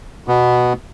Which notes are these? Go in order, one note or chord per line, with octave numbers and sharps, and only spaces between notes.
B2 B3